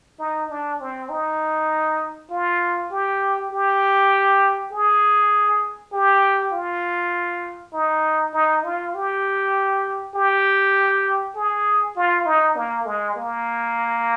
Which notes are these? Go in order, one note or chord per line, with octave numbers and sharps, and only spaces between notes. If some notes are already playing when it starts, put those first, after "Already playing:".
D#4
D4
C4
D#4
F4
G4
G4
G#4
G4
F4
D#4
D#4
F4
G4
G4
G#4
F4
D#4
A#3
G#3
A#3